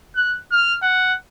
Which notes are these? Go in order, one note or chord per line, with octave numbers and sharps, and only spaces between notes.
F#6
F6
F#5